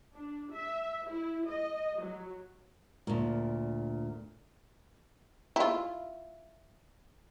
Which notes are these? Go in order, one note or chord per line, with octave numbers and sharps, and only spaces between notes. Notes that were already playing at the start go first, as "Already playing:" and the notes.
D4
E5
E4
D#5
F#3
D2 A#2
E4 F4